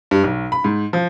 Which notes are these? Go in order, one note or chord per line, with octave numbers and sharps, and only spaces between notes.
G2
B1
B5
G#2
F3